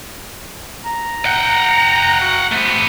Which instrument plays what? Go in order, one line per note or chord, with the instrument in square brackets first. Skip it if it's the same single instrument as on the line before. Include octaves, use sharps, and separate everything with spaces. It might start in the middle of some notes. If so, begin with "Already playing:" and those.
[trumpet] A#5
[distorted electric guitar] F#5 G5
[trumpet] F#4
[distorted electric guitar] A3 B3 [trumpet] C4